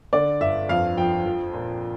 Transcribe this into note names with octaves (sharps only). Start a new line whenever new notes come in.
D3 D5
G1 E5
F2 F5
F3 G5
F3
A#2